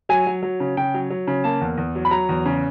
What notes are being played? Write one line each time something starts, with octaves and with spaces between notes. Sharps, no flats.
F#3 G#5
F#3
F#3
C#3
C#3 G5
F#3
F#3
C#3
A#3 A5
E2
E2
F#3
B5
F#3 A#5
E2
C#3